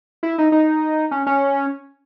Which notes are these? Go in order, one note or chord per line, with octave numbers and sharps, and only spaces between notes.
E4
D#4
D#4
C#4
C#4